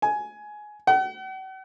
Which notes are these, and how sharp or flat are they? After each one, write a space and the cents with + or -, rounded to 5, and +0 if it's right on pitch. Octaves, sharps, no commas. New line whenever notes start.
G#5 +15
F#5 +45